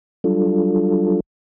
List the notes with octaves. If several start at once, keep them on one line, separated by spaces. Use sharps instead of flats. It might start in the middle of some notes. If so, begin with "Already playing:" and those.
F#3 G3 D4 F4 A4